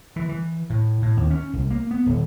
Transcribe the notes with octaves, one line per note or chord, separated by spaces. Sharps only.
E3
E3
A2
A2
D#2
C#4
C2
A#3
B3
D#1